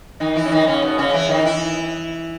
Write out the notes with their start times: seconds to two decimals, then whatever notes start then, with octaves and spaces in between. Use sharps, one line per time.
0.20 D#3 D#4
0.36 E3 E4
0.45 C#4
0.52 D#3 D#4
0.67 C#3 C#4
0.82 B2 B3
0.98 C#3 C#4
1.14 E3 E4
1.29 D#3 D#4
1.45 E3 E4